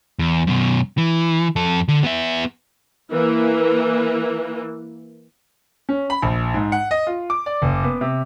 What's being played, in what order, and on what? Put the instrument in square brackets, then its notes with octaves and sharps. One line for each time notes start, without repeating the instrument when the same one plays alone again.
[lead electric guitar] E2
F#2 B2
E3
F2 A4
D3
B3 E5
[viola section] E3 A#3
[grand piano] C#4
B5
A#1
G#2
F#5
D#5
F4
D6
D5
F#1
B3
C3